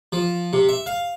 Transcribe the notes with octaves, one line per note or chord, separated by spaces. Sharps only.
F3
C3
E5
F5